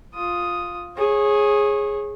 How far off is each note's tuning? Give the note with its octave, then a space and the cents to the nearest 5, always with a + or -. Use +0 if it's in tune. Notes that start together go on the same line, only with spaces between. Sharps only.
F4 +5 D#6 +0
G#4 +0 C#5 -25